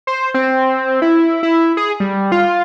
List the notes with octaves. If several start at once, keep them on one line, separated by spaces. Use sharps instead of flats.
C5
C4
E4
E4
G#4
G3
F4